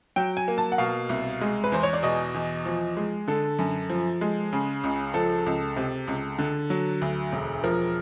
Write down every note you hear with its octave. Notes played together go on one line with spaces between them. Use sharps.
F#3 G5
G#5
A#3
A5
F#5
B2 F5
C2
G#3
B4
E2 C5
C#5
D5
B2 D#5
E2
F3
G#3
D3 A4
F#2
F3
G#3
C#3
C#2
F3 A4
C#2
C3
C#2
D3
F#3
D2
E1
F3 A#4